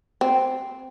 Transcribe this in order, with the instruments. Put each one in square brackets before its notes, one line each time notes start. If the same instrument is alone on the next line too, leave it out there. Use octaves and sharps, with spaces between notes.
[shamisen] C4